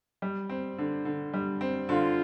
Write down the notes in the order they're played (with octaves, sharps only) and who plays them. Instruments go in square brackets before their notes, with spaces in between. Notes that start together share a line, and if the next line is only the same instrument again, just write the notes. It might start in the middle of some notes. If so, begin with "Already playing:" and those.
[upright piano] G3
C4
D3
D3
G3
C4
[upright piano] D3 [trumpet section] F4